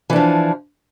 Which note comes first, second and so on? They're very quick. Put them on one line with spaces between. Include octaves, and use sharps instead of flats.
E3 D4 F3